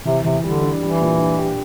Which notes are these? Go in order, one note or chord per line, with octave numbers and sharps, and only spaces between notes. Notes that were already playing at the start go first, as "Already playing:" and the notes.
C3 E3
E2 C3
D3 G3
D4
E3 G3
A#2
D4
G4